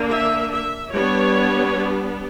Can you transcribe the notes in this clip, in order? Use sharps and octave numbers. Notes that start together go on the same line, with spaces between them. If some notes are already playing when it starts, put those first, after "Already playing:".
Already playing: D3 A#3 D4
E5
E5
G3 B3 D4 C#5